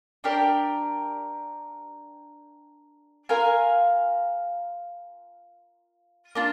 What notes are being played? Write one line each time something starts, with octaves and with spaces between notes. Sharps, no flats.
D4 G4 A#4 D5
F4 A#4 F5 G#5
A#3 D4 F4